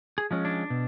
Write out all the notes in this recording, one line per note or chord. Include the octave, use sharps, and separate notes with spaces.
G#4
F3 G#3 C#4
D4
B2